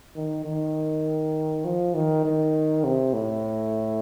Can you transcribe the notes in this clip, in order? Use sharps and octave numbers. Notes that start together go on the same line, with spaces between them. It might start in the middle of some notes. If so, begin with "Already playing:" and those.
D#3
D#3
F3
D#3
D#3
C3
A2